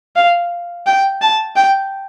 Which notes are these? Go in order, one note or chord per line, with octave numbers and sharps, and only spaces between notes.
F5
G5
A5
G5